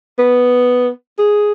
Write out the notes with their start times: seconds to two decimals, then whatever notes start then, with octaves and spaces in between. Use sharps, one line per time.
0.18 B3
1.18 G#4